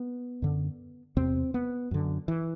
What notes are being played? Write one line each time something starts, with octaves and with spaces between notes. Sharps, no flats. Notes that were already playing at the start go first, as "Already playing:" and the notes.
Already playing: B3
F#2 D3
E2 C3 C4
B3
F#2 D3
E3